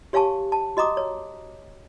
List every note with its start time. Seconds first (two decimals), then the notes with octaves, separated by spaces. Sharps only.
0.13 G4 C#5 F5 G#5 A5 C#6
0.52 A5
0.77 F#4 D#5 A#5 D6 D#6
0.97 C#5